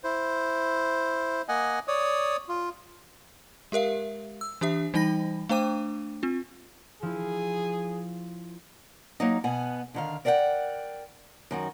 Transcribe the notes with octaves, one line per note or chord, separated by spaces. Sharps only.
E4 C5
A#3 D#5 F#5 G#5
C#5 D5 D#6
F4
G#3 G4 A#4 E5 F5
E6
E3 D4 G4 E5
E3 G3 D#4 G5 B5 A#6
A3 D4 C5 G5 D6 D#7
C4 F4
F3 E4 G#4
F#3 A#3 D#4
B2 B3 F#5 G#5
D3 D#3 F5
A#4 D5 E5 F#5 G5
F#2 D#3 F#4